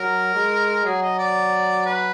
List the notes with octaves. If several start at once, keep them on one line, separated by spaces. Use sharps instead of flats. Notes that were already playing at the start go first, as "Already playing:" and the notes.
Already playing: F#3 A#4
G#3
F#3 G#4
D#5
D5
B4